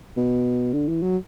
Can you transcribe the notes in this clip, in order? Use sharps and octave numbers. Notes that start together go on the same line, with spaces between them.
B2
D3
E3
F#3